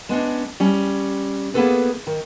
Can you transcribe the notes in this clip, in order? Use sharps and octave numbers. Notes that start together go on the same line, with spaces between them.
G#3 B3 C#4 D4
G3 C#4
A#3 B3 C#4 G#4 A4 B4
D#3